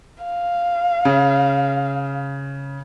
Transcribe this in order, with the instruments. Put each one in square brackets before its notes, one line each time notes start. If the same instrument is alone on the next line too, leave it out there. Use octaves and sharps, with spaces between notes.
[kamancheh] F5
[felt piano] C#3